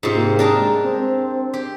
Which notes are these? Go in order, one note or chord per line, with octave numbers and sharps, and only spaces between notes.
G#2 C3 F4
A#3
D4 G#4 A#4 A5
G#3
C4
G4